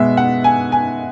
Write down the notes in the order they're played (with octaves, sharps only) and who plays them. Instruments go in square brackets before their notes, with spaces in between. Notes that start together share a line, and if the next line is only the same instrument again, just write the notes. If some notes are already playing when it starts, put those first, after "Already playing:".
Already playing: [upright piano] B2 G#3 B3 E5
F#5
G#5
G#5